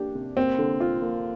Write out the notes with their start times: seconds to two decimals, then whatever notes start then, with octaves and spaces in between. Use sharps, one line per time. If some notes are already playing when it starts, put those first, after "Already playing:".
Already playing: A#3 D4 G4
0.15 C3
0.37 A#3 C4
0.58 D3
0.80 F4
1.02 A#3